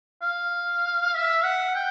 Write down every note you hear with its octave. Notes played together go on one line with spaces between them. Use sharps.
F5
E5
F#5
G5